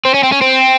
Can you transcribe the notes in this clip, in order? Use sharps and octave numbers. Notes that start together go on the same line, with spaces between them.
C4
C#4
C4
C#4
C4